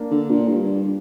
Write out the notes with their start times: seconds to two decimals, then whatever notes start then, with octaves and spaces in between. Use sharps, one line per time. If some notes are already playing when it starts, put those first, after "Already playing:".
Already playing: A#3 D4
0.11 D3
0.30 A#2
0.48 G2